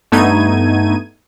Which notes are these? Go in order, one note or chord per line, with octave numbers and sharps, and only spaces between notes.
G2 A3 B3 D#4 G#6 D#7